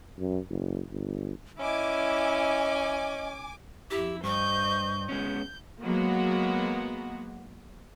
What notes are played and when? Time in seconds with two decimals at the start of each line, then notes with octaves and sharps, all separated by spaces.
0.19 F#2
0.50 F#1
0.91 G1
1.59 C#4 E4 D#5 G#5 D6
3.91 F2 E4 G4 E6
4.24 G2 C5 D#5 C#6 G6
5.09 G#3 B3 C#4 G6
5.81 F#3 G#3 A#3 B3 F#4